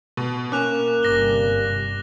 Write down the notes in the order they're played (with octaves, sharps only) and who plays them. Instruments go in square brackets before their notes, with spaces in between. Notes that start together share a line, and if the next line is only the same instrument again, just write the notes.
[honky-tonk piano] B2
[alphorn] A#3 [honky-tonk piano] C#4 [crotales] D6 F#6 F7
[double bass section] G1 C3 G3 [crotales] D6 A#6 G7